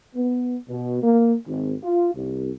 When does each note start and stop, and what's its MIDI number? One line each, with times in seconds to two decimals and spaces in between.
0.15 0.56 59
0.68 1.00 47
1.03 1.35 58
1.47 1.74 32
1.83 2.12 65
2.15 2.52 36